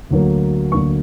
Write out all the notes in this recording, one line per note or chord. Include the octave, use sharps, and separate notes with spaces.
D2 D3 F#3 A#3
D2 D3 F#3 A#3 C#6